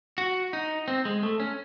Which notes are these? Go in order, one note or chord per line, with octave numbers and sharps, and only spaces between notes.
F#4
D#4
C4
G#3
A3
C#4